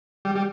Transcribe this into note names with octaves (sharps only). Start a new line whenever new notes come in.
G3
G3